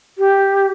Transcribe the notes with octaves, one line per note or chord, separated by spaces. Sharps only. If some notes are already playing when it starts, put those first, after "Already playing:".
G4